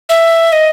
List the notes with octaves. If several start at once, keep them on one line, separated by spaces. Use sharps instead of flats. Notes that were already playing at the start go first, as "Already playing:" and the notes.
E5
D#5